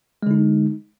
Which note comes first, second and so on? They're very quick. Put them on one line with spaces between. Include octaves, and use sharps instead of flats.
G#3 D3 D#4